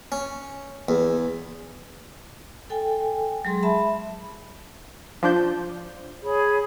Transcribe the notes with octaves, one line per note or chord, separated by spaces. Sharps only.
C#4
E2
A4 G5 G#5
F#3 G#3 G#4 C6
E5 A5 B5
F3 D4 G6
G#4 C#5 B5